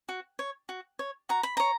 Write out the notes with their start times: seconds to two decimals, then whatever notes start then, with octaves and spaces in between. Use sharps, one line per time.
0.09 F#4
0.39 C#5
0.69 F#4
0.99 C#5
1.29 F#4 A#5
1.43 B5
1.57 C#5 A#5